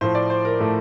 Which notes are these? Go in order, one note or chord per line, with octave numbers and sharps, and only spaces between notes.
A2 F3 A3 C5
D5
C5
A#4
A2 F3 A3 A4